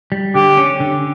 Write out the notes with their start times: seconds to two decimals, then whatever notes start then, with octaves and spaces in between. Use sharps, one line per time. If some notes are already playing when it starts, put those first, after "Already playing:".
0.12 G3
0.35 D3 G4
0.57 C#4
0.80 D3